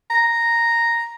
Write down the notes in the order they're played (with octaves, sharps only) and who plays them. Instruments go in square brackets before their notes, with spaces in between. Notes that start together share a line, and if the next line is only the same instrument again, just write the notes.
[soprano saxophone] A#5